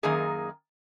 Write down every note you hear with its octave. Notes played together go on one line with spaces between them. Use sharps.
F#2 D#3 A#3 D#4 G#4